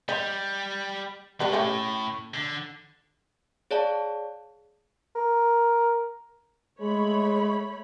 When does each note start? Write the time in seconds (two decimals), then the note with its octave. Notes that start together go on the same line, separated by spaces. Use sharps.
0.09 G3 D#4
1.40 A2 G3 B4 A#5
1.53 A3 C#4 G4
2.34 D3
3.71 G#4 C#5 D5 F5 A5
5.16 A#4
6.81 G#3 A3 C#5 B5